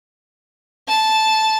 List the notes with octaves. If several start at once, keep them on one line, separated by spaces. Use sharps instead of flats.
A5